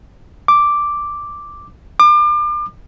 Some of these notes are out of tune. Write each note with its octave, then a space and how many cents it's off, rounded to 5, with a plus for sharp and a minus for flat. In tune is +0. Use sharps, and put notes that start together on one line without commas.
D6 +0
D6 +35